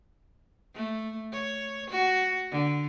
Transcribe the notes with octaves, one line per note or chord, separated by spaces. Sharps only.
A3
C#5
F#4
D3